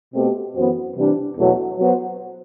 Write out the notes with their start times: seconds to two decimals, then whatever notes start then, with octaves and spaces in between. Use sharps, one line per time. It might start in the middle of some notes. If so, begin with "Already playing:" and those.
0.14 B2 A3 C4 G4
0.55 F#2 E3 B3 F#4 C5
0.96 C3 E3 G3 D4
1.36 E2 B2 F#3 A3
1.77 F#3 B3 F#4 C5